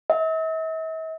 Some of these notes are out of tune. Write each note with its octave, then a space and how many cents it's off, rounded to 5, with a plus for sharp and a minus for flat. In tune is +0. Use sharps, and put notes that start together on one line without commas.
E5 -45